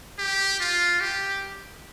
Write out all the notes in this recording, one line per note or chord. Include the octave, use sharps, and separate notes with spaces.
G4
F4
G4